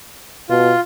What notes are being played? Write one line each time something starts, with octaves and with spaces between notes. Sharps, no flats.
B2 F4